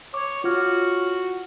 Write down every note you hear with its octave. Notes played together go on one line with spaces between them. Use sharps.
C#5 D6
F4 F#4 C#5 F6